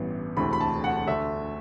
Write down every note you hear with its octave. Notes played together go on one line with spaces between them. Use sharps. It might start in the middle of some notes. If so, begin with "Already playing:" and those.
Already playing: A1 G2 E3 B3
E1 D2 C3 E3 A3 B5
B5
A5
F#5
D2 D3 A3 E5